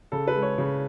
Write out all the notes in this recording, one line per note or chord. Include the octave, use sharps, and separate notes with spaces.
C#3 A4
B4
G#3
C#5
C#3